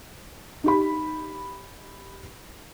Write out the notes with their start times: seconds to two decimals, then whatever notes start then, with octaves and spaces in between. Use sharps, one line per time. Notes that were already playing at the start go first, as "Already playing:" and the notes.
0.64 D#4 G4 B5